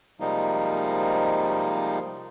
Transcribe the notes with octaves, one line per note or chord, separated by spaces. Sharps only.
C3 F3 G3 G#3 A#3 D#4